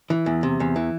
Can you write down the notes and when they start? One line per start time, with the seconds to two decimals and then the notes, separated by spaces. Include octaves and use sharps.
0.10 E3
0.26 E2
0.43 C3
0.60 E2
0.76 E3